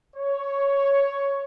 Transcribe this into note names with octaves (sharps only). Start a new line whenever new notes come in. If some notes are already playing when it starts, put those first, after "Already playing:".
C#5